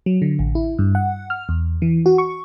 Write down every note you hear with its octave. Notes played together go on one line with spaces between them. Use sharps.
F#3
D3
A1
E4
G2
F#5
F6
E2
E3
F#4
C#6